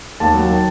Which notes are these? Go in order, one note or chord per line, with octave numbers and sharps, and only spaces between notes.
D#2 A5
F#3
D#3